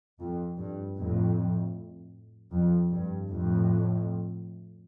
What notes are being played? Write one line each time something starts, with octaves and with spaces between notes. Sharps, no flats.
F2
G2
F2 A2
F2
G2
F2 A2